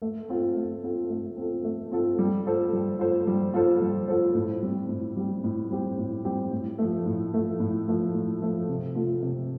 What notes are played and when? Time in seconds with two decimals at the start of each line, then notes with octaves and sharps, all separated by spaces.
0.02 A3
0.29 C4 F4 A4
0.56 A3
0.83 C4 F4 A4
1.10 A3
1.37 C4 F4 A4
1.64 A3
1.92 C4 F4 A4
2.19 G3
2.46 F4 A4 C5
2.73 G3
2.99 F4 A4 C5
3.27 G3
3.54 F4 A4 C5
3.81 G3
4.08 F4 A4 C5
4.35 A2
4.63 G3 C4 G4
4.89 A2
5.17 G3 C4 G4
5.44 A2
5.70 G3 C4 G4
5.98 A2
6.25 G3 C4 G4
6.51 A2
6.78 F3 A3
7.06 A2
7.34 F3 A3
7.60 A2
7.88 F3 A3
8.14 A2
8.41 F3 A3
8.69 C3
8.95 A3 F4
9.22 C3